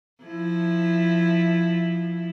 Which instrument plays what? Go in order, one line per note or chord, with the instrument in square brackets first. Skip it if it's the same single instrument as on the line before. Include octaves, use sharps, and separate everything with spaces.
[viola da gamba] F3 E4